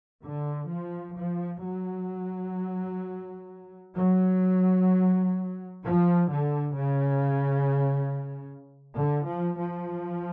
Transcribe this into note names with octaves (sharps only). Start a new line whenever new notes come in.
D3
F3
F3
F#3
F#3
F3
D3
C#3
D3
F3
F3